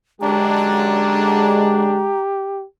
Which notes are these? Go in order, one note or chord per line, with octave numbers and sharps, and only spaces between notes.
F#2 D3 G#3 D4 G4 A#5